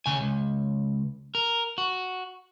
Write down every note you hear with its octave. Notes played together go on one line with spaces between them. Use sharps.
D2 C#3 G#5
C#2
A#4
F#4